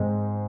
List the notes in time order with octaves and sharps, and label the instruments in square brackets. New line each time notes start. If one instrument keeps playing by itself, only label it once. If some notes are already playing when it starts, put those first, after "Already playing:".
Already playing: [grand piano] G#2 G#3 C4